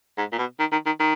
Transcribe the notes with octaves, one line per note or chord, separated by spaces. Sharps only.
G#2
A#2
B2
D#3
D#3
D#3
D#3